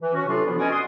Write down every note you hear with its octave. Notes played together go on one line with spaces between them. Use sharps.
E3
C#4 F#4
A2 C3 F#3 D4 F4 C6
D3 E3 F3 B3 D4 E4
B3 C#4 F#4 D5 D#5 G#5
F#4 C6 D#6